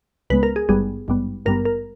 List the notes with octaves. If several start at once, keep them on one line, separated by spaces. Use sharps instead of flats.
C#2 C#3 G#3 B3 B4
A#4
G#4
G#1 G2 G3 B3 G#4
G#1 G2 G3 B3
G#1 G2 G3 B3 A#4
A#4